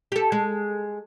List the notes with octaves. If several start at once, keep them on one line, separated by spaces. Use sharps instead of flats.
G4 A4
G#3